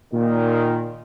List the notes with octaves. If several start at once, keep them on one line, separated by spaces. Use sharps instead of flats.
A#2 D#3